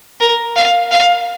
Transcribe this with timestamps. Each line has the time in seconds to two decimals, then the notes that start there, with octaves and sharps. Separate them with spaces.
0.20 A#4
0.56 F5
0.91 F5